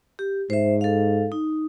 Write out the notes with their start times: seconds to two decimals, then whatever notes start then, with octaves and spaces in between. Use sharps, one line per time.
0.19 G4
0.50 G#2 C5 E5
0.81 A4 F5
1.32 D#4